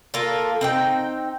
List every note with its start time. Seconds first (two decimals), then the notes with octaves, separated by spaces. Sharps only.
0.14 A#3 F4 A4
0.61 C4 D#4 G5